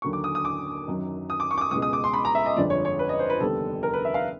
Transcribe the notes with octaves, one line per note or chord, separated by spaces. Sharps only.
D#2 D3 F#3 A#3 C#6
D6
D#6
D#6
D6
F#2 D#3 F#3
D#6
D6
C#6
D6
D#6
C#2 B2 G#3 D#6
D#6
D6
C6
B5
A#5
E5
D#5
G1 F2 D3 F3 G#3 D5
C#5
C#5
B4
D#5
C5
B4
F1 D#2 D3 G3 B3 A4
A#4
B4
E5
F5